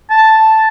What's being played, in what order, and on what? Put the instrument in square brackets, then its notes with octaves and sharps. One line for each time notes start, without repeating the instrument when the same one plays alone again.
[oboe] A5